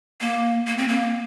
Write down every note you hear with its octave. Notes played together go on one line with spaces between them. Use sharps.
A#3
A#3
C4
A#3